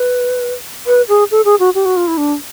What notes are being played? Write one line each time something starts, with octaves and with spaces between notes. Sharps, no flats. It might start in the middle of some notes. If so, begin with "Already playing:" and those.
Already playing: B4
B4
G#4
A4
G#4
F#4
G4
F#4
F4
E4
D4